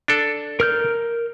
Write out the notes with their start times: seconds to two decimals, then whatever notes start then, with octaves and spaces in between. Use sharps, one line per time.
0.08 D4 A4
0.60 A#4 F6 G6